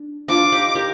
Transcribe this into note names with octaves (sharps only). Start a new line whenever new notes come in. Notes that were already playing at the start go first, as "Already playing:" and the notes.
Already playing: D4
D4 F4 D6
D#4 G4
G4 A#4